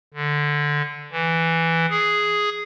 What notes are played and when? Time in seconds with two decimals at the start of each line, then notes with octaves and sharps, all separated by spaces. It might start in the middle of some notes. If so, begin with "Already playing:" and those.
0.14 D3
1.12 E3
1.90 G#4